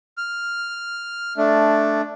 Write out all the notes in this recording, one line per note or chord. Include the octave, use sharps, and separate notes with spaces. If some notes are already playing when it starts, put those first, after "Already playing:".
F6
A3 D4